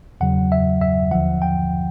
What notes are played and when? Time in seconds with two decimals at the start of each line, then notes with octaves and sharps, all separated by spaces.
0.21 E2 C#3 F#3 F#5
0.52 E5
0.81 E5
1.11 D#2 D3 F3 F#5
1.42 G5